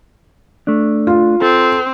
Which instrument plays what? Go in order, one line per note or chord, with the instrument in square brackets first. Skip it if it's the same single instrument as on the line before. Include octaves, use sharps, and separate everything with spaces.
[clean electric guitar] A3 D4
[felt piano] F4
[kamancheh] C4 [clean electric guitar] A4